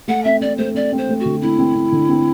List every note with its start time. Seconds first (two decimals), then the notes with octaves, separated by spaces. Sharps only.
0.08 A3 F#5
0.24 C4 E5
0.41 C4 D5
0.58 A3 C5
0.74 C4 D5
0.92 C4
0.98 C5
1.09 A3
1.20 F#4
1.25 D3
1.42 C4 E4
1.59 C4
1.75 C4
1.92 D3
2.09 C4